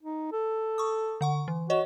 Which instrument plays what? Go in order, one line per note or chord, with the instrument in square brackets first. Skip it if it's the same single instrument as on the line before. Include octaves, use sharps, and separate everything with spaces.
[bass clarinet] D#4
A4
[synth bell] C#6 D#6
D3 F#5 C#6
E3
[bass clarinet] F#4 [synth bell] C#5 D#5 E7